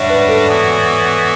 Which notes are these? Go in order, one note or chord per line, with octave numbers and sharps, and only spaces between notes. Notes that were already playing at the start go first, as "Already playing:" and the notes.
Already playing: G3 D4 F#4 C#5 D5 E5 F#5
B4
A4
E3 B3 F#4